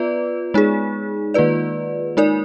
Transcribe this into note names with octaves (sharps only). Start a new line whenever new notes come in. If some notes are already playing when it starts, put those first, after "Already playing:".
Already playing: B3 F4 B4 D5
G#3 D#4 G#4
D#3 A#3 F4 B4 D5
G#3 D#4 A#4 D5